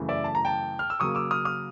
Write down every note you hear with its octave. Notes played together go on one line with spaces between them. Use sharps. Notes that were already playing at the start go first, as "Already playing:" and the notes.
Already playing: F#2 C#3 E3 A3
D5 E5
A5
A#5
G5 A5
F6
E6
C#3 F#3 A#3 C#6 D#6
D6 E6
D#6 F6
D#6 F6